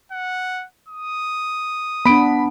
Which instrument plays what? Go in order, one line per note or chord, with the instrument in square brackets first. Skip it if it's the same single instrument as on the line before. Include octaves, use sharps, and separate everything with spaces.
[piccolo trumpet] F#5
D#6
[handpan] B3 D4 [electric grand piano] B5 D7